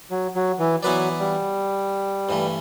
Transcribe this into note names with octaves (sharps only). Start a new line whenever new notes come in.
F#3
F#3
E3
E3 F#3 B3 E4 B4 D5
G3
G2 E3 A3